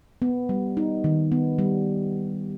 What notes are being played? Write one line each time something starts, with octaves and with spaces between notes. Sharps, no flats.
B3
G3
D#4
D#3
B3
G3